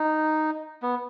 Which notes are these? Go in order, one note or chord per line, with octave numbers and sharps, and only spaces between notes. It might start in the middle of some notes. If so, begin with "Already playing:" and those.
Already playing: D#4
B3